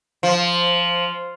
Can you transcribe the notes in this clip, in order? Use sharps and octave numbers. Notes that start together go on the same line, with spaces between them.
F3